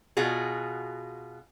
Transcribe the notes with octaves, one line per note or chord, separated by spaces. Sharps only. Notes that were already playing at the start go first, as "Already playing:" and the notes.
B2 F4 F#4 G#4